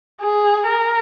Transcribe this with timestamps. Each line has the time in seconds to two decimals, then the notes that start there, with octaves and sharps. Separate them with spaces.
0.21 G#4
0.68 A#4